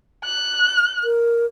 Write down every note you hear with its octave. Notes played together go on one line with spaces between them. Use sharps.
F#6
A#4